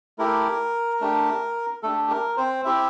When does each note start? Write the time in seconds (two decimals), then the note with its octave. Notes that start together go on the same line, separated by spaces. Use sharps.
0.18 A3 E4 G4 A#4
1.01 A3 D4 G4
1.83 A3 D4 G4 A4
2.10 A#4
2.37 C4 C5
2.65 C4 E4 G4 E5